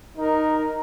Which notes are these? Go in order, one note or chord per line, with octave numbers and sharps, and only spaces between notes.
D#4 A#4